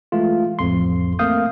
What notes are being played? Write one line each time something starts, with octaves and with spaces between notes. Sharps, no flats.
E3 G#3 A3 F4
A1 F2 C6
A3 A#3 C4 F5 D#6 G6